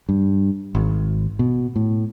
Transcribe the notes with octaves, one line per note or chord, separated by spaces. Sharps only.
G2
G#1
B2
A2